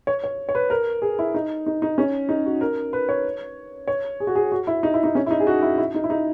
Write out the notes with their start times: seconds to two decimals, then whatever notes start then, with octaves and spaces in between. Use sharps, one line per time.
0.07 C#5
0.24 C#5
0.49 C#5
0.55 B4
0.70 A#4
1.02 G#4
1.19 E4
1.34 D#4
1.66 D#4
1.82 D#4
1.98 C#4
2.29 D#4
2.46 F#4
2.61 A#4
2.93 B4
3.09 C#5
3.88 C#5
4.20 G#4
4.27 F#4
4.35 G#4
4.52 F#4
4.67 E4
4.83 D#4
4.94 E4
5.04 D#4
5.15 C#4
5.26 E4
5.31 D#4
5.40 G#4
5.47 F#4
5.62 E4
5.78 E4
5.94 D#4
6.04 E4
6.10 D#4